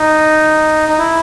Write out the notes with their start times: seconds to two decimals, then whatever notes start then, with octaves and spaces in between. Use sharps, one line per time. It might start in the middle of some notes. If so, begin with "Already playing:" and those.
Already playing: D#4
0.89 D#4
0.99 E4